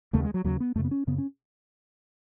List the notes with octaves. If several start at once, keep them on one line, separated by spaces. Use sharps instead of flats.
D#2 C#3 A3
G#3
F#3
D#2 C#3 F#3
B3
F#2 C#3 A3
B3
C#4
F#2 C#3 B3
C#4